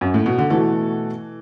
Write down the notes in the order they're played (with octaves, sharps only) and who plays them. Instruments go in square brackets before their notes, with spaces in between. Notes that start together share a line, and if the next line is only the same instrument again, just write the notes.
[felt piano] F#2
A2
B2
D3
[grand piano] B2 A3 F#4 A4 [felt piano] E3